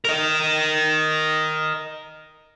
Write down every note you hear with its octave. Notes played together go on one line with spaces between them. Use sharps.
A#4 D#5